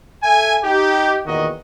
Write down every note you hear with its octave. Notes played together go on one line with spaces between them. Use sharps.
A4 E5 G#5
D#4 G4
E2 A#2 D#3 F#4 D#5